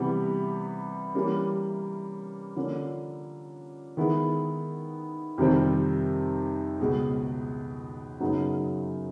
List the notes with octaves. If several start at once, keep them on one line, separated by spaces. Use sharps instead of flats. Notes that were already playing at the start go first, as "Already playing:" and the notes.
Already playing: C3 E3 G3 B3
E3 G3 A#3 C#4
D3 F3 A#3 C#4
D#3 G#3 B3 E4
F2 C3 D#3 G3 C4
C#2 B2 G#3
F#2 C#3 F#3 B3 D#4